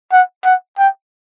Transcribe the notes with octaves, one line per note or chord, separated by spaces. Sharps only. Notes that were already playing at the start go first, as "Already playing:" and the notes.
F#5
F#5
G5